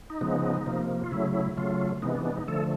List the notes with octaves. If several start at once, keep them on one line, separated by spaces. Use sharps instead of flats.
D#4
C#3 F3 G#3 B3
C3 F3 A#3
F4
C#3 F#3 A3 E4
E4
C#3 F#3 A3 F4
C3 E3 G#3 B3 D#4
D4
D4
D#4
D3 F3 A3 A4